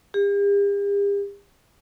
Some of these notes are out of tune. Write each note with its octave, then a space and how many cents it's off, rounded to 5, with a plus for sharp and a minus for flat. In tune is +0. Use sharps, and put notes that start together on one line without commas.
G4 +45